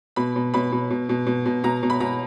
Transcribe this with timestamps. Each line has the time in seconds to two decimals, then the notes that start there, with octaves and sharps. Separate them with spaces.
0.16 B2 B5
0.36 B2
0.54 B2 B5
0.72 B2
0.90 B2
1.09 B2
1.26 B2
1.46 B2
1.64 B2 A#5
1.83 B2
1.90 B5
2.00 B2 A#5